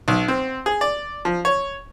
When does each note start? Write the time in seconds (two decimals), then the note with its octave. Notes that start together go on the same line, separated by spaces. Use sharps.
0.08 B1
0.28 C4
0.66 G#4
0.81 D5
1.25 F3
1.45 C#5